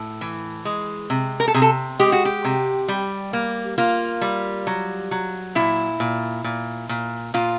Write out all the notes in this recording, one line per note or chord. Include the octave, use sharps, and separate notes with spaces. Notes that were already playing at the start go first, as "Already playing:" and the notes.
Already playing: A2
E3
G#3
C3
A#4
A4
C3 G#4
A4
G#3 G4
F#4
G4
C3
G3
A#3
A#3 F4
G3
F#3
F#3
A#2 E4
A#2
A#2
A#2
A#2 F4